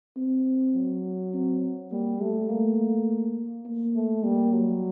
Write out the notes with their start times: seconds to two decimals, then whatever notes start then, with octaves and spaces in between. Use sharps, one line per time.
0.17 C4
0.75 F#3
1.34 C4
1.91 G3 A#3
2.20 G3 A3
2.49 A3 A#3
3.65 A#3
3.95 A3
4.24 G3 A#3
4.53 F#3